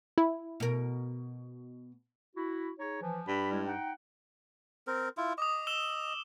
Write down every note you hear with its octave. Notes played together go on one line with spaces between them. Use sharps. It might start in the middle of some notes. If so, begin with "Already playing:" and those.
E4
B2 A#4
E4 F#4
D#4 G#4 C#5
E3 F3
G2 B5
G3 G#3 E4
D#4 F#5 G5
C4 A#4
E4 F4
D#5 D6 D#6
E6 E7 G7